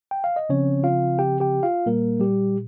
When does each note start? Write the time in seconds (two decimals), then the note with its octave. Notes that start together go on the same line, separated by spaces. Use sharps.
0.11 G5
0.24 F5
0.36 D#5
0.49 C#3 F3 C4 C#4 C#5
0.83 F4 F5
1.19 G4 G5
1.40 G4 G5
1.63 F4 F5
1.86 A#2 G3 A#3 A#4
2.20 G3 G4